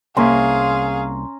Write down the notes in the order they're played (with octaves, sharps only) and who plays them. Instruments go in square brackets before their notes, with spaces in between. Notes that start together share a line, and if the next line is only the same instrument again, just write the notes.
[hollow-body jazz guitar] C2 A#3 E5 [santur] C#4 A#5 C6 [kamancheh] G#4 F5